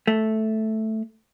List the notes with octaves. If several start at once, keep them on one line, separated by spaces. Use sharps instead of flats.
A3